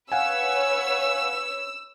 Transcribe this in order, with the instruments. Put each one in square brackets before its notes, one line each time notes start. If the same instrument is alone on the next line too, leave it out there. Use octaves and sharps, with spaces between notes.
[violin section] B4 C#5 [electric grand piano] F5 F#5 G#5 [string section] E6